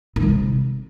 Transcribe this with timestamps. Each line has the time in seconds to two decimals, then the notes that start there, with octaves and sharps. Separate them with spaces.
0.16 D#3
0.22 G#3
0.28 C3